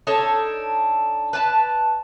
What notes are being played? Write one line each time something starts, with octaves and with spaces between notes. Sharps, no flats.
D4 D#4 A4 C#5
B4 D5 G5 A5